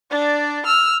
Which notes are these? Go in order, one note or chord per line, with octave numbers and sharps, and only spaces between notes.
D4 D5
E6 F6